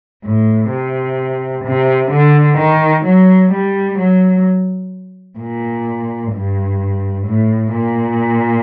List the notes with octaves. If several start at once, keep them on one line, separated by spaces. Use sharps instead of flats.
A2
C3
C3
D3
D#3
F#3
G3
F#3
A#2
G2
A2
A#2